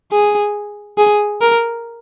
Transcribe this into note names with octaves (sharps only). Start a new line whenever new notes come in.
G#4
G#4
A#4